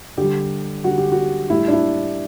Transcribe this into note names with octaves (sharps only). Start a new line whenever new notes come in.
D3 G3 G4
D3 G3 F#4
G4
F#4
A2 G3 E4
D4
E4